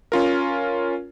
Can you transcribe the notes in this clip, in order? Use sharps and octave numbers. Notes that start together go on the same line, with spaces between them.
C#4 F4 A#4